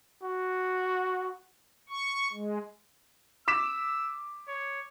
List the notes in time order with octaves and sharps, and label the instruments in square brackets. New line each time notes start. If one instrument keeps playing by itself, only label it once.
[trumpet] F#4
[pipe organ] C#6
G#3
[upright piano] D6 B6 E7 [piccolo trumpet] E6
[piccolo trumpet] C#5